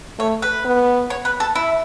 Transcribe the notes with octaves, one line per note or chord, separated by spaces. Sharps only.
A3 C#5
B4
B3
C#5
B4
A4
E4